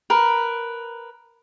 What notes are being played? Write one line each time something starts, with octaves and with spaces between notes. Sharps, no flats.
A#4 B4